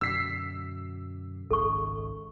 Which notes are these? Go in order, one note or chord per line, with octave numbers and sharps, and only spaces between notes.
F#2 B2 D3 E6 B6 C7
G#1 C#2 A4 C#6